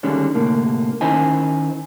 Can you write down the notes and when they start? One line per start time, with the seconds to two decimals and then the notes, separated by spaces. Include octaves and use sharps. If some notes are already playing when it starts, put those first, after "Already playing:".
0.03 D3 D#3 G3 G#3 C#4 D4
0.35 C2 A2 D3 A#3
1.01 D#3 C#4 E4 C5 D#5 G#5